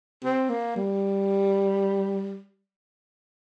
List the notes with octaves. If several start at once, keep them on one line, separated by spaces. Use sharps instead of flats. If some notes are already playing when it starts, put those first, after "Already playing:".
C4
A#3
G3